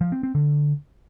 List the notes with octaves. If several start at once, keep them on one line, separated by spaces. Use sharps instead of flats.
F3
C4
C4
D3